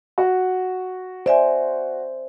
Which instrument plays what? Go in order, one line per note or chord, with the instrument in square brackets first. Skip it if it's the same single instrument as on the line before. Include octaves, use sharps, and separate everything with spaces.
[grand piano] F#4
[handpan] C5 [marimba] D5 E5 G#5